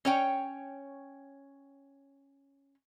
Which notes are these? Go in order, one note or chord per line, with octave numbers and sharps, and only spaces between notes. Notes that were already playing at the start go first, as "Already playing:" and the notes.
C#4 C#5 G5